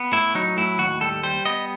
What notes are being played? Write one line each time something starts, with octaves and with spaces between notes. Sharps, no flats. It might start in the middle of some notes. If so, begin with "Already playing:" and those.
Already playing: B3
A2 E4
F#3 D#4
A2 E4
D#2 F#4
G3 A4
G3 C5
B3 D#5